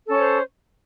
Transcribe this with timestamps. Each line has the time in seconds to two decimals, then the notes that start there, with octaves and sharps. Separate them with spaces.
0.06 A4
0.10 C#4
0.13 C#5
0.17 C5